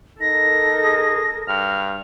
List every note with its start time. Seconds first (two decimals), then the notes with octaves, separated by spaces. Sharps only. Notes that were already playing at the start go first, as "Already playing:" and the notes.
0.21 D#4 A4 A#4 A#6
0.84 G#4
1.48 G2 F6